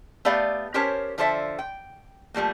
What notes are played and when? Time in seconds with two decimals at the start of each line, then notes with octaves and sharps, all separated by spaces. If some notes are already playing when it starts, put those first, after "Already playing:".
0.25 A3 B3 G4 D5 F5
0.74 C#4 G4 A#4 C5 C#5 A5
1.18 D3 F3 A4 C5 D5 E5
1.59 G5
2.34 F3 G3 A3 A#3